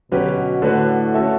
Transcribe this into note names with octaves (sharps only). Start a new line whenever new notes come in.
B2 D3 F#3 C#4 G4 B4
A2 D3 A3 D4 F#4 B4
A3 C#4 F#4 A4 E5